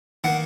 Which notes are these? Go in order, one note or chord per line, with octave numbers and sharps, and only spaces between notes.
D#3 A#3 F#5